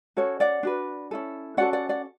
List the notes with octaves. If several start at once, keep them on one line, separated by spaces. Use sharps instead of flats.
C#4 F#4 A4 C#5
D5 F#5
D4 F#4 B4
C#4 E4 A4
C#4 F#4 A4 D5 F#5
D5 F#5
D5 F#5